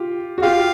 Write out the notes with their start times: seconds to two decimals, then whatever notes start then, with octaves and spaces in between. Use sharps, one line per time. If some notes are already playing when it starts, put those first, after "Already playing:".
Already playing: F4 G4
0.38 F#4
0.42 F4 G4 F5